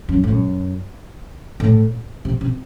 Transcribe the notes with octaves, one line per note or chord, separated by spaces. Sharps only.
F#2
A2
F#2
A2
C3
C3